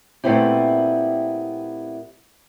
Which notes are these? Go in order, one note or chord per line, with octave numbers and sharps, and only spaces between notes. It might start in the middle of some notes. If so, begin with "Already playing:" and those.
A#2 A3 B3 C4 E4 G4